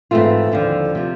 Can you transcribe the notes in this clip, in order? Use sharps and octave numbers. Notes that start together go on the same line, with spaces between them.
G#2 E3 A3 C4 F4
D#2 D3 F3
C3 F3